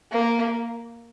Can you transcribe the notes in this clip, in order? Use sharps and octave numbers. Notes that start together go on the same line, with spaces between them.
A#3